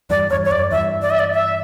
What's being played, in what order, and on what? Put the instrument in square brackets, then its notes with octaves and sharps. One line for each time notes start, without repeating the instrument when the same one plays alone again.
[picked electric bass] E2 G2 [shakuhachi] D5
[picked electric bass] E2 G2 [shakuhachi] C#5
[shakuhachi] C#5
[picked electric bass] F#2 [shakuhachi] D5
[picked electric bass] E2 G2 [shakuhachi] E5
[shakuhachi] D5
E5
D5
E5